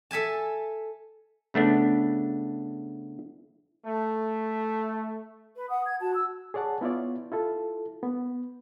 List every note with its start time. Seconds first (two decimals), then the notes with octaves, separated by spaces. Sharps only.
0.11 A4 E5 G#5 A5
1.54 C#3 A3 B3 D4
3.85 A3
5.56 B4
5.69 F#5 D#6
5.85 G#6
6.01 F#4 A5
6.14 E6
6.54 G#4 C#5 D5 F#5 A5
6.81 B3 E4 F4 C#5 D5
7.32 E4 F4 A4
8.03 B3